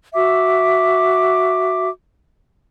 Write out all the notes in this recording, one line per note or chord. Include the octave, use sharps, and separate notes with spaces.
F#4 E5 D6